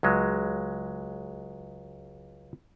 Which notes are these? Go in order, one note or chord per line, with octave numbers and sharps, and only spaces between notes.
C#2 F#3 G#3